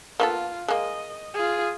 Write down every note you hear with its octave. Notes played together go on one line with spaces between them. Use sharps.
A#3 B3 F4 A4
G#3 A#3 D#5
F4 G#4